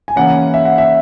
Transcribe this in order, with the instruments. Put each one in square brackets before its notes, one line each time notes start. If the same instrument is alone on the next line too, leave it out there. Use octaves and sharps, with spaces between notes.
[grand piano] G#5
C#3 E3 A#3 C#4 F#5
E5
F#5
E5